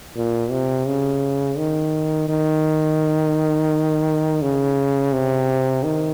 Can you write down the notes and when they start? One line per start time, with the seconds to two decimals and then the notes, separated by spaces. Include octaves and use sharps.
0.16 A#2
0.51 C3
0.87 C#3
1.57 D#3
2.28 D#3
4.42 C#3
5.12 C3
5.84 D#3